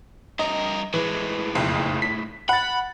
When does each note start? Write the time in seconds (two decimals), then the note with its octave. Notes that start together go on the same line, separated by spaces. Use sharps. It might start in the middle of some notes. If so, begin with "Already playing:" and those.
0.39 G2 A#4 D#5
0.94 A2 E3 G#3
1.55 F#1 B1 F2
2.02 B6
2.49 F#5 B5 A6